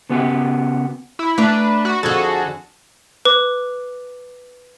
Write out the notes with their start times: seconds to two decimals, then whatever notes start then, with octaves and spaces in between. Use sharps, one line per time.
0.10 C#3 B3 F#4 G4
1.19 E4
1.38 A3 D4 B4 A#5
1.85 F#4
2.03 F2 D3 F#4 G#4 A4
3.25 B4 D6